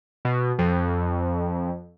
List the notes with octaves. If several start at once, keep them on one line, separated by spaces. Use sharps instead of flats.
B2
F2